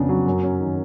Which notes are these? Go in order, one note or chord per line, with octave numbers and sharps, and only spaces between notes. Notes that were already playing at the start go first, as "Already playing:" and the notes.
Already playing: F2 C#3 B3 D4
F#3
F#2
C#4
D#3